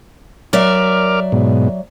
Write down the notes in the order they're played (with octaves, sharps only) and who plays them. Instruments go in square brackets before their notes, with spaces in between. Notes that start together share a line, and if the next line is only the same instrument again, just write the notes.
[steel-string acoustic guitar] F#3 D5 E5 [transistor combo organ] A#4 D6 F6
[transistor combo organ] G#2 B2